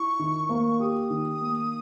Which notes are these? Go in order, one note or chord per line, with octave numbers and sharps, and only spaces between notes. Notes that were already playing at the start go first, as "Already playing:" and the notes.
Already playing: E4 C#6
D#3
A#3
G4 D#6
D#3
A#3